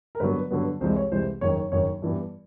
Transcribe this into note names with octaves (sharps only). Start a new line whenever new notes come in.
A#4
G2 D3 F#3 B3 B4
G2 D3 F#3 B3
C2 C3 E3 G#3 C5
C#5
C2 C3 E3 G#3 C5
F#1 F#2 D#3 C#5
C#5
F#1 F#2 D#3 C#5
G2 E3 G3 B3